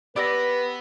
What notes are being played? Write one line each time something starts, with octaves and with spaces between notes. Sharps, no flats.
B3 G4 B4 D5 B5 E6 A#6